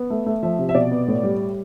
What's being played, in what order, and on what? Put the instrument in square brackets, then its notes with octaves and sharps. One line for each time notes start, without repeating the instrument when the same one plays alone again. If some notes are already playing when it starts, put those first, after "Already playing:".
Already playing: [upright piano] B3
A3
A3
F3 E5
C3
E5
B2 D5
B3
A2
G3